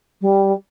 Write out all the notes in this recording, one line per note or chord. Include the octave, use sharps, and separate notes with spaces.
G3